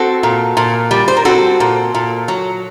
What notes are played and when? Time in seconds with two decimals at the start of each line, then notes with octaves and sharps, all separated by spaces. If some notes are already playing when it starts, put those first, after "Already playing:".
Already playing: C4 F#4 A4
0.23 A#2
0.57 A#2
0.91 G3
1.08 C5
1.17 A#4
1.25 C4 F#4 A4
1.60 A#2
1.95 A#2
2.28 F#3